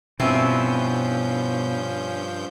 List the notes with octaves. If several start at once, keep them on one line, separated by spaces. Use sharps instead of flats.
G2 B2 F3 C4 C#4 E4 G6